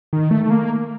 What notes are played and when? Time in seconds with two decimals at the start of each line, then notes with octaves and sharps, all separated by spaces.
0.13 D#3
0.31 A3
0.50 A#3